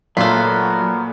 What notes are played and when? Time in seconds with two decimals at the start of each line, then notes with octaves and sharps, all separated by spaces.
0.17 A#2 F#3 A3 B3 F4 F#4 A#4 B6